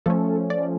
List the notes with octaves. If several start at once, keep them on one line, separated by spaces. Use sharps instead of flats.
F3 A3 C#4 A4
D5